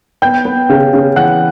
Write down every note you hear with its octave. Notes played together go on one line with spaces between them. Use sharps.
B3 G5 G6
B3
C#3
C#3
E3 F#5 F#6